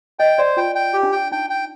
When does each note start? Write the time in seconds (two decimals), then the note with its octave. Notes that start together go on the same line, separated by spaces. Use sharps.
0.19 D#5 G5
0.38 C5 D5
0.57 F4 G5
0.75 G5
0.94 G4
1.03 D4
1.12 G5
1.32 D#4 G5
1.50 G5